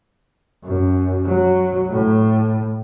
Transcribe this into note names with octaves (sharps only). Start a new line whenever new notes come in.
F#2
F#3
A2